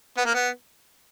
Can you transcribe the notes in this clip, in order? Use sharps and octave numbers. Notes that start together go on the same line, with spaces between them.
B3
A#3
B3